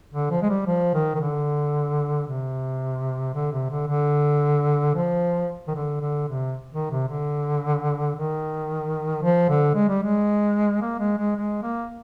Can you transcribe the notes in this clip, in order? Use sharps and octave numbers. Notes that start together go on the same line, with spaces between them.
D3
F3
G#3
G3
F3
D#3
D#3
D3
C3
D3
C3
D3
D3
F3
D#3
D3
D3
C3
D#3
C3
D3
D#3
F3
D3
G#3
G3
G#3
A#3
G#3
G#3
G#3
A#3